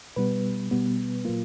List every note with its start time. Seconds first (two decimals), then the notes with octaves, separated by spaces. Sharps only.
0.16 B2 G3 B3 B4
0.71 B2 G3 B3
1.25 A#2 F#3 A#3 F4